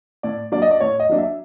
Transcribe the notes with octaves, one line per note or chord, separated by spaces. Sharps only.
A2 D5
F#3 A#3 D4 D5
D#5
D5
A2 C#5
D#5
F#3 A#3 D4
E5